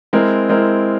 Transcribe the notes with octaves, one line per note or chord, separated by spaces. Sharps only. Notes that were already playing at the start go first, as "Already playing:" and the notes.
G#3 C4 E4 A#4
G#3 C4 E4 A#4